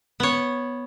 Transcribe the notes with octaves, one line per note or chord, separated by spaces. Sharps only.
B3 C#5